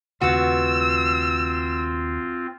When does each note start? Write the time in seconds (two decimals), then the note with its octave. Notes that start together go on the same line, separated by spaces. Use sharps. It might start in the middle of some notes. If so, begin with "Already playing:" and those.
0.21 D#2 C#3 A3 B3 C4 F4 F#4 E6